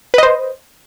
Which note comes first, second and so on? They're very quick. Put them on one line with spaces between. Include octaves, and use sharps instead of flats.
B4 D#5 C5